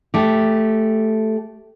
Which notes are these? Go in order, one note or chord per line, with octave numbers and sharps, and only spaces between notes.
A3 G4